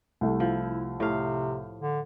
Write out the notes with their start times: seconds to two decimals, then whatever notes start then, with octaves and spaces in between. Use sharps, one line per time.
0.21 C2 A3
0.40 F3 E4
1.00 A2 C3 F5
1.81 D3